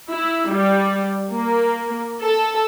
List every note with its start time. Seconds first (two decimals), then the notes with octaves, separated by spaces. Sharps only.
0.11 E4
0.51 G3
1.31 A#3
2.22 A4